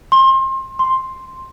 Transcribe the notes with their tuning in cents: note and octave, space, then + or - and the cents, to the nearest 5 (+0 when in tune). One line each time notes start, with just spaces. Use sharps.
C6 +30
C6 +5